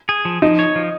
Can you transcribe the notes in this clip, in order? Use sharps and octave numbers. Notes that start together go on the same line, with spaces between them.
G#4
F3
F3 D#4
C#5
F3